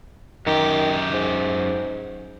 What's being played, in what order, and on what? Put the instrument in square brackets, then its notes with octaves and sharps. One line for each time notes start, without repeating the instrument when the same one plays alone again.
[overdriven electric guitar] F#2 G4 [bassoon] D#3
[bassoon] G#2